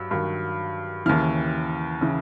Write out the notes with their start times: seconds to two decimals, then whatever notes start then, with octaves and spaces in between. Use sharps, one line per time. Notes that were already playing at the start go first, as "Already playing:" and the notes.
Already playing: G2 F#3 E6
0.11 G2 D#3 F#3
1.06 D#2 C#3 E3 F6
2.01 C#3 E3